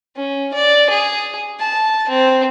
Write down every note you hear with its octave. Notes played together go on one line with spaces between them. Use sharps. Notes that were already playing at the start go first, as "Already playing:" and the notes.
C#4
D5
G#4
A5
C4